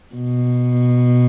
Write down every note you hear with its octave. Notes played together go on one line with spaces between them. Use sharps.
B2